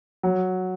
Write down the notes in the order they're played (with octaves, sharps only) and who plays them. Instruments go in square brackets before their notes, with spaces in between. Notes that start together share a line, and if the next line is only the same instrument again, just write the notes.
[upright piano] F#3